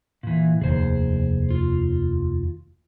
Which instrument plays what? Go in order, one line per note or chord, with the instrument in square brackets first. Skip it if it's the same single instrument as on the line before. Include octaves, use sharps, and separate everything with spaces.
[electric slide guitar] A#2 E3
[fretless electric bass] F1 D#2 [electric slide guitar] G#4 C5
[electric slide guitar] F4